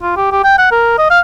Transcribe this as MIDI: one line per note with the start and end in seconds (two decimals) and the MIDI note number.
0.02 0.15 65
0.17 0.30 67
0.32 0.41 67
0.44 0.57 79
0.59 0.69 78
0.72 0.95 70
0.98 1.06 75
1.10 1.20 77